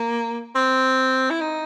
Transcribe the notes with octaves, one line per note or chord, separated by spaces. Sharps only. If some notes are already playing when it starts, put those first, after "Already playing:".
Already playing: A#3
C4
E4
D#4